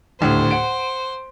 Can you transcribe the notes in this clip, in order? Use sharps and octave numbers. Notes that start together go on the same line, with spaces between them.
D#1 D2 A2 C5
F#5 D7